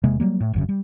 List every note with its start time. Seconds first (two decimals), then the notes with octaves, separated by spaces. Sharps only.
0.04 E1 C3 G#3 A#3
0.20 F#3 G3 A#3
0.41 A2
0.53 G1 F#2 C#3
0.69 G3